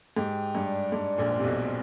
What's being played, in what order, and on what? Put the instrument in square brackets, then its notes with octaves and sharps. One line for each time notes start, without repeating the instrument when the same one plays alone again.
[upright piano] G#2 [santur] G4
[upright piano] G2 [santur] D4
[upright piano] G#2 [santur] D4
[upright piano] A#1 A#2
[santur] C5
[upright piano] C3
B1 B2